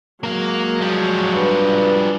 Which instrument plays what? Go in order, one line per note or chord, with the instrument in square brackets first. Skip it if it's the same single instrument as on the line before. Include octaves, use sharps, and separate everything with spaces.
[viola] F#3 G#3 [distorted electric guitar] A#3 F5
[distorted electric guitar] F3 G3
[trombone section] G2 B4